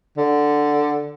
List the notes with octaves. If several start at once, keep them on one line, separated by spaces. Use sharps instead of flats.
D3